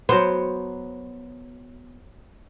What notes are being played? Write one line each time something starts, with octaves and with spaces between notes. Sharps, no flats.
F#3 B3 C5